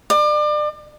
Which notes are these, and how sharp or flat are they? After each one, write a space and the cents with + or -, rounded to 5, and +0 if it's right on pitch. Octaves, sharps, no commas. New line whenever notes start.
D5 +35